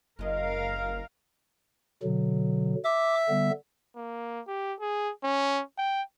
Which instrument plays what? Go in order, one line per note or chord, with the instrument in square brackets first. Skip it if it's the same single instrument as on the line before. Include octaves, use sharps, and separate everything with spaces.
[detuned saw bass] F#1 [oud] G#3 D#5 [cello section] A#4 F5
[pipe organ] B2 D3 F#3
[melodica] E5 [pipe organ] D6
[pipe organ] D3 G3 B3
[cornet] A#3
G4
G#4
C#4
G5